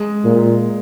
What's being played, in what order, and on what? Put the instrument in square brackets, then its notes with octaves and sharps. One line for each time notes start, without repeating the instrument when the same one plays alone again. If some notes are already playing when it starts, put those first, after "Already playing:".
Already playing: [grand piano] G#3
[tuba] A#2